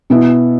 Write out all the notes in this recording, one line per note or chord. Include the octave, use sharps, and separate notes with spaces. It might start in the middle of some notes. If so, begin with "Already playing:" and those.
B2 B3 E4